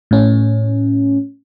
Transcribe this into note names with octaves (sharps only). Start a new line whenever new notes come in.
A2 C#4